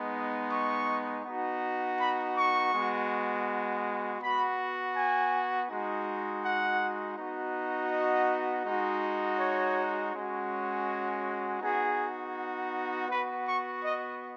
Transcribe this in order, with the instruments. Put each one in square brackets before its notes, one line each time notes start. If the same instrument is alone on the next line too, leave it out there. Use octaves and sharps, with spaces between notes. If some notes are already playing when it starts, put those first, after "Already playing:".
Already playing: [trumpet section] G#3 B3 D#4
C#6
B3 D#4 F#4
B5
C#6
G#3 B3 F#4
B3 F#4 B5
G#5
G#3 D#4 F#4
F#5
B3 D#4 F#4
D#5
G#3 D#4 F#4
C#5
G#3 C#4 F#4
B3 D#4 F#4 G#4
B3 F#4 B4
C#6
D#5